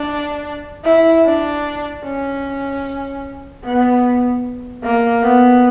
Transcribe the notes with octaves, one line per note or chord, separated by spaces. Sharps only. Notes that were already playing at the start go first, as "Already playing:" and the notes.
Already playing: D4
E4
D4
C#4
B3
A#3
B3